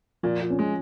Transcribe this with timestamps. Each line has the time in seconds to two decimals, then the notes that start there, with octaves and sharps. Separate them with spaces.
0.23 A#2 F3
0.41 A#2
0.50 C#4
0.59 G#3